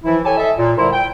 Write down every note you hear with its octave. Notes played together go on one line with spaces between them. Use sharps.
E3 F3 E4
G4 A4 C#5 G#5 A5
A4 D#5 E5
A#2
D3 G3 E4 A#4 C5
G5